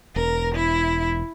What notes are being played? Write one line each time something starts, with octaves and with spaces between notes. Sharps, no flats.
E1 A#4
E4